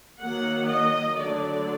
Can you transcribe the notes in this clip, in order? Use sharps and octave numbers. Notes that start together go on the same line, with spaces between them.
D#3 F#3 A#3 F#5
D#5
D3 F#3 A3 D5